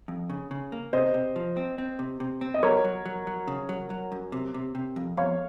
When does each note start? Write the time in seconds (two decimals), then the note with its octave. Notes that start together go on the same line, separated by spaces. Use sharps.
0.08 F2
0.30 C#3
0.51 C#3
0.72 A#3
0.93 C3 C5 D#5
1.14 C3
1.36 F3
1.57 C4
1.78 C4
1.99 C3
2.20 C3
2.41 C4
2.54 D#5
2.63 F#3 A#4 C#5
2.84 F#3
3.06 F#3
3.27 F#3
3.48 C#3
3.69 F#3
3.90 F#3
4.12 F#2
4.32 C3
4.54 C3
4.75 C3
4.96 F2
5.17 F2 C#5 F5